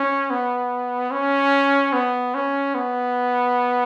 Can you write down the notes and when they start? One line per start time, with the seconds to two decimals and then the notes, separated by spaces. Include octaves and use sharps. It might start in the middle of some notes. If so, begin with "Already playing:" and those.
Already playing: C#4
0.30 B3
1.11 C#4
1.93 B3
2.35 C#4
2.75 B3